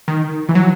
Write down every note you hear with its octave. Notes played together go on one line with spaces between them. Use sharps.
D#3
E3
F#3